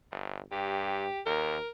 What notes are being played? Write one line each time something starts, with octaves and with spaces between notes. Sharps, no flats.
G1
G2 G4
D#2 A#4